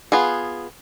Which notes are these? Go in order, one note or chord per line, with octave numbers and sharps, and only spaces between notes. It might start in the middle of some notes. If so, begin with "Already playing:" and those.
B3 F4 G#4